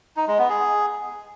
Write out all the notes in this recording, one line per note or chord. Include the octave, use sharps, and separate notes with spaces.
D#4
G#3
B3
G#4